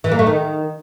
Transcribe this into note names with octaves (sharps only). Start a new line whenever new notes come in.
E3
A#3
A3
D#3